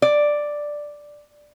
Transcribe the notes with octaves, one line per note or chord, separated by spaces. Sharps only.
D5